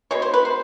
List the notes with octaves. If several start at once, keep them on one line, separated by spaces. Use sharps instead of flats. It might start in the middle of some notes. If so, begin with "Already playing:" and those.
B2 G#3 C#5
C5
B4
C5